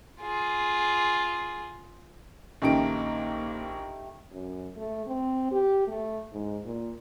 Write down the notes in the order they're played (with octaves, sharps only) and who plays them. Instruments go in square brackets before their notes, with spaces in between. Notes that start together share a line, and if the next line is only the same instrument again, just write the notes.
[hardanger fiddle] F4 G#4
[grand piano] A#1 D#3 D7 [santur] A3 D#4 G4 [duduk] A#3 [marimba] C#4
[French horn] F#2
A3
C4
G4
A3
G#2
A#2